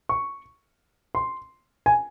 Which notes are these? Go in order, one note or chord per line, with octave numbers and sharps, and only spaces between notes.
C#6
C6
G#5